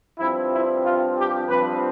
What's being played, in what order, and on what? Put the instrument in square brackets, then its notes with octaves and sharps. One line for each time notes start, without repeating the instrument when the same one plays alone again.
[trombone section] G2 F3 C4 E4
E4
F4
G4
G2 F3 C4 B4